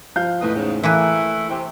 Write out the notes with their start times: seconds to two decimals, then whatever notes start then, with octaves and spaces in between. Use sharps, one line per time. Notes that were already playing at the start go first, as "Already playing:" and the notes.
0.16 F3 F5 G6
0.41 E2 A2 A3 B4 D#5
0.55 G#2 C#3
0.83 E3 A3 A#3 E4 B4
1.50 C3 G5